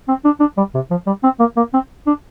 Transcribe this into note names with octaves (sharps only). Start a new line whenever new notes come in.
C4
D4
D4
G3
C3
F3
G3
C4
A#3
A#3
C4
D4